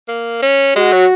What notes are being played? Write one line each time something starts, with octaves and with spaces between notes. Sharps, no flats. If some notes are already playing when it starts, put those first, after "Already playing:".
A#3
C#4
G#3 F#4
F#3